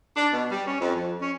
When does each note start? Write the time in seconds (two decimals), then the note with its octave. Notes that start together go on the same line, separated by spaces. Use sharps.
0.16 D4
0.33 B2
0.51 G3
0.67 C#4
0.81 F2
0.96 F2
1.22 C#4